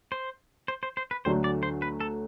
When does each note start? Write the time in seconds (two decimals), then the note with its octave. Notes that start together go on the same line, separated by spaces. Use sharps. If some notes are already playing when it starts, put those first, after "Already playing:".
0.12 C5
0.68 C5
0.83 C5
0.97 C5
1.11 B4
1.25 D2 D3 F#3 A3 C5
1.44 D5
1.63 C5
1.82 B4
2.00 A4